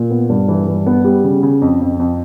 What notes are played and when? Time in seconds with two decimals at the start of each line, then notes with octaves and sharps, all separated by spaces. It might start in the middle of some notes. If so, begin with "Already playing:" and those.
Already playing: A#2
0.10 B3
0.30 G2
0.48 E3
0.67 G2
0.86 B3
1.04 G3
1.24 C#3
1.43 C#3
1.62 F2
1.81 F2
1.99 F2